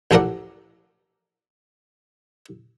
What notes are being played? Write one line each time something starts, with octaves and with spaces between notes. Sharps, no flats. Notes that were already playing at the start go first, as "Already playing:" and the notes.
A1 F3 A4 A#4 D5 F#5